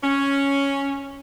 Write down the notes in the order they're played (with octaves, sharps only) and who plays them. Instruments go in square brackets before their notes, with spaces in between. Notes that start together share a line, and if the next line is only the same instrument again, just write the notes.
[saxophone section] C#4